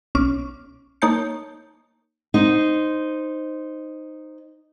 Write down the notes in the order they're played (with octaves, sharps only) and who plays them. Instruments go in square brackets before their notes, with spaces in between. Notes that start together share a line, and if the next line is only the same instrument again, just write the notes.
[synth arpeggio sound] B1 C#4 D6 F6
A#3 D#4 C#5 A5 G6 C#7
[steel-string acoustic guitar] D#4 C5